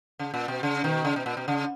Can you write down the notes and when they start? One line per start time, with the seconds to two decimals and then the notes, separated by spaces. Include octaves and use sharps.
0.19 C#3
0.34 A#2
0.48 B2
0.63 C#3
0.84 B2 D#3
1.05 C#3
1.16 B2
1.26 A#2
1.37 B2
1.48 C#3